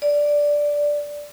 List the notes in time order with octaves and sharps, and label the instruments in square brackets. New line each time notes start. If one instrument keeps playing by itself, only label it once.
[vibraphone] D5